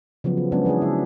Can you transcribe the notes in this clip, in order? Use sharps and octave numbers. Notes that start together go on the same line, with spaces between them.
C#3 F3 F#3 B3
B3
C#3 F#3 G#3 B3 C#4 D4
E3 D4 F#4 G#4
C#3 E5